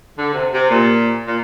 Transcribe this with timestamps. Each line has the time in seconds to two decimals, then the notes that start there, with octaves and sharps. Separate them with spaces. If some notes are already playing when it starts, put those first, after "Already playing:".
0.18 D3
0.33 C3
0.53 C3
0.70 A#2
1.28 A#2